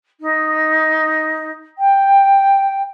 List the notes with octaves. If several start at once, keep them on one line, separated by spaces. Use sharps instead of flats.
D#4
G5